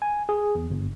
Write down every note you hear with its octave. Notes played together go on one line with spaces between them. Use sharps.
G#5
G#4
E2
G1